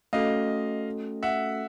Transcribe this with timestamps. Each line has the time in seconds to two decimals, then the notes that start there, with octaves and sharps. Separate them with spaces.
0.13 A3 C#4 F#4 A4 D#5 F5
1.23 E5 F#5